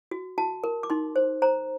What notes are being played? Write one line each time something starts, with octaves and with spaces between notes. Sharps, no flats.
F#4
F#4 A5
A#4
D6
D#4 C6
C5
C5 A#5